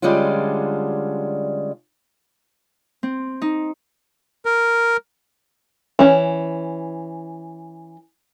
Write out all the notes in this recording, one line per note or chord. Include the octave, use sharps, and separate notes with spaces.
D3 G3 G#3 C#4 D4 F4
C4
D#4
A#4
E3 C#4